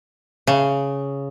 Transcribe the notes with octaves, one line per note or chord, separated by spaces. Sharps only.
C#3